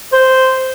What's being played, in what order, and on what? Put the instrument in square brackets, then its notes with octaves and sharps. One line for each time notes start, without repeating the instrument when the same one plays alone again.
[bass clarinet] C5